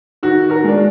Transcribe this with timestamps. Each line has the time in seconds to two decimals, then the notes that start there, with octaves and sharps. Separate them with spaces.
0.23 D#3 F#4
0.50 F#4 A#4
0.64 G#3 D4